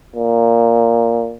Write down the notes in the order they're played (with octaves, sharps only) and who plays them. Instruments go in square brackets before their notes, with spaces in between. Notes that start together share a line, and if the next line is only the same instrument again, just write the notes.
[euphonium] A#2